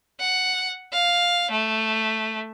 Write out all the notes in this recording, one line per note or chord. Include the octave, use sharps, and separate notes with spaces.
F#5
F5
A3